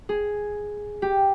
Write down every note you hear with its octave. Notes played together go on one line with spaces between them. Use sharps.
G#4
G4